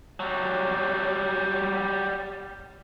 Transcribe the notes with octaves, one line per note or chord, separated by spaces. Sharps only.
F#3 G3